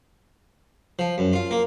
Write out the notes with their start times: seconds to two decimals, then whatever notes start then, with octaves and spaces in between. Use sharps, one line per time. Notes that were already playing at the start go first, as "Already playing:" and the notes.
0.99 F3
1.18 F#2
1.33 F4
1.51 A#3